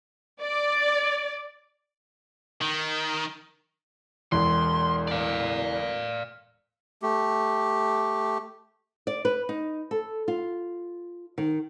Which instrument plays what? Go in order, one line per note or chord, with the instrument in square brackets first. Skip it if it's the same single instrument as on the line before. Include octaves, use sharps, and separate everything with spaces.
[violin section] D5
[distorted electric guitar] D#3
[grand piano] E1 E2 [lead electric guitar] C6
[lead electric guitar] D5 F5
[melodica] A3 G4
[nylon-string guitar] D5
B4
D#4
A4
F4
D#3